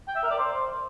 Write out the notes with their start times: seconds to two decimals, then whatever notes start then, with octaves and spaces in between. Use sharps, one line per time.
0.08 G5
0.15 E5
0.23 A#4
0.31 D5
0.38 C5